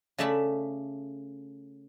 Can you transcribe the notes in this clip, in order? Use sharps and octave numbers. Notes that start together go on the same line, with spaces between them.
C#3 A3 D5 E5 A5 B5